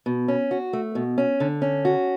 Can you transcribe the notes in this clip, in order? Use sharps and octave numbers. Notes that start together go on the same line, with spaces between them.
B2
C#4
F#4
A3
B2
C#4
D3
C#4
F#4